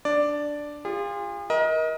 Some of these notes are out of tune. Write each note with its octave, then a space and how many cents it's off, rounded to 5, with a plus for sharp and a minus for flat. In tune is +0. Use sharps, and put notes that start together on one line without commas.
D4 +0 D5 +0
F4 +0 G#4 -45
A#4 +30 D#5 +25